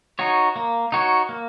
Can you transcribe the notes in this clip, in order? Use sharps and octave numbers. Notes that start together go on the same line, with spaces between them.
D#4 F#4 C#5
A#3
D#4 F#4 C#5
A#3